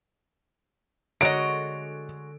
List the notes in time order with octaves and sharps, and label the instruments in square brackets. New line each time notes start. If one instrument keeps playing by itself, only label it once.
[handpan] D3 [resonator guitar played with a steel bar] G#3 F#4 C#5 [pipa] A#4 D#5 [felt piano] D7